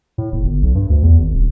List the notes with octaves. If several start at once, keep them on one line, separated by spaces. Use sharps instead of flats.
A2
F#1
G1
B1
G2
D2
E2
G#1
D#1